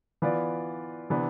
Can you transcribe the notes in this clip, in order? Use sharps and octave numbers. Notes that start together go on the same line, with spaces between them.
E3 B3 F4 B4 D5
C3 E3 B3 D4